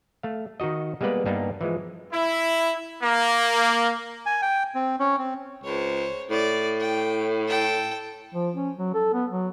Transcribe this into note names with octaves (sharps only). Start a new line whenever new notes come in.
A3 F5
D#3 D#4 F#4 D#5
G3 G#3 A#3 B3 B4 D5
G2 G3 A#3 B3 D4 D#4
E3 F3 G#3
E4
A#3
G#5
G5
C4
C#4
C4
C#2 C5 C#5
A2 D5
G5
A4 G5
F3
C#4
F#3
A4
B3
F#3